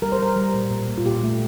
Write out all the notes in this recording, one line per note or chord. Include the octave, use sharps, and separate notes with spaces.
G3 A#4
C5
G3 A#4
G3
A#2
A#2
A#2
F4
A#2 G4
A3